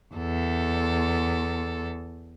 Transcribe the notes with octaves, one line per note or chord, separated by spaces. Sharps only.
E2 A4